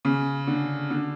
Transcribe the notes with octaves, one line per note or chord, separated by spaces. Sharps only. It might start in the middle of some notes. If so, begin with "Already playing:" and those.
C#3
D3
D3